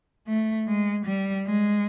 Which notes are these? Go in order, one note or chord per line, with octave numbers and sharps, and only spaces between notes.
A3
G#3
G3
G#3